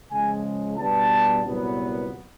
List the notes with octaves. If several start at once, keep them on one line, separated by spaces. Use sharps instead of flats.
C#3 F3 G#3 G#5
B2 G3 B3 D4 A5
C2 A#2 F#3 B3